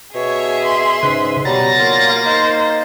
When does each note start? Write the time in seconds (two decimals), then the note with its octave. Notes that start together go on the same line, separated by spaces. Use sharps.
0.15 B2 G#4 C#5 E5
0.64 C6
1.03 G#2 C#3 B4
1.45 B2 F#3 G3 A#5 A6 A#6
1.78 A#3 F4
2.26 D#4 C5